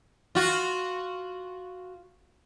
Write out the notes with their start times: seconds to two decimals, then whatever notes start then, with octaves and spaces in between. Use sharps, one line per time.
0.35 F4 F#4